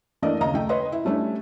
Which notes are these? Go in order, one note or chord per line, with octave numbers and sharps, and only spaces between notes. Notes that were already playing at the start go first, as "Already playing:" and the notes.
E3 A3 A#3 D4 D5 D#5
D#2 C#3 D#5 A#5
A3 G5
B4 C#5 D#5 C6
E4
G3 A3 C#4 D4 E4